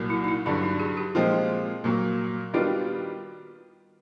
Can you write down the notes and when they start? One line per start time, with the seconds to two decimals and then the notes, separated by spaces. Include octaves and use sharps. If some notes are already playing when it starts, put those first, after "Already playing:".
Already playing: C2 A#2 F#3
0.10 E4
0.24 D#4
0.28 E4
0.46 G2 D3 F#3 E4
0.63 D#4
0.79 G#4
0.97 G4
1.15 A#2 F3 G#3 C4 F4
1.84 A#2 F#3 A#3
2.53 D#3 G3 B3 D4 F4 F#4